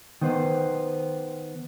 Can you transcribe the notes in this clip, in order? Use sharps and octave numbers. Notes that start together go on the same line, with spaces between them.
D#3 B3 C5